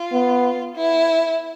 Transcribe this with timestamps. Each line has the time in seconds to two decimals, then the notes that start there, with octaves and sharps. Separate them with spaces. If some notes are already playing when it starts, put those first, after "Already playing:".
Already playing: F4
0.12 B3
0.75 E4